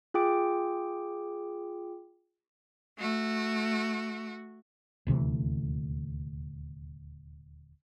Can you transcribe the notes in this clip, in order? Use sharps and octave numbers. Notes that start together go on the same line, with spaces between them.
F4 G#4 G5 D6 D7
A3 F#4
D#1 D2 C3 E3